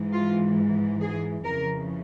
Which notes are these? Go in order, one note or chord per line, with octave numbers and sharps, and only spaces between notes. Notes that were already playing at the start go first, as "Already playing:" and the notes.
Already playing: G#2 E3
F4
G#4
F2 C#3 E3 A#4